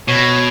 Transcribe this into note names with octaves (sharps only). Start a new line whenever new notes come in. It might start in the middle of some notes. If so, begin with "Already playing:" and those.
B2 C#5